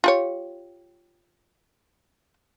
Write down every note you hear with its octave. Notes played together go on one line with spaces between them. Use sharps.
F4 G4 C#5